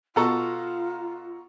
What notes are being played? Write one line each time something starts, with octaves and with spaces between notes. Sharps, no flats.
B2 F4 A4 F#5 A#5 C#6